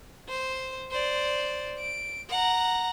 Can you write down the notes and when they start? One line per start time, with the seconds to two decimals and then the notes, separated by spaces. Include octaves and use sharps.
0.29 C5
0.91 C5 D5
1.79 D7
2.29 F#5 A#5